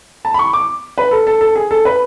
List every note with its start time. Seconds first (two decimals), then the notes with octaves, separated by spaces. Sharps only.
0.25 A5
0.34 B5
0.39 C#6
0.53 D6
0.98 B4
1.11 A4
1.27 A4
1.41 A4
1.55 G#4
1.71 A4
1.85 B4